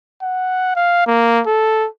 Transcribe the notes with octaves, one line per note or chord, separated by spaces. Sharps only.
F#5
F5
A#3
A4